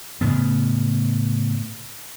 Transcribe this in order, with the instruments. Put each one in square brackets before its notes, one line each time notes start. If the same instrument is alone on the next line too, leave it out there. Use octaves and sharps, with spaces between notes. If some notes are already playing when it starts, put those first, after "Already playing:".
[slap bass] A2 C#3 B3